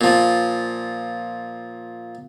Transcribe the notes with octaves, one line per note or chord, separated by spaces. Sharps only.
A#2 F3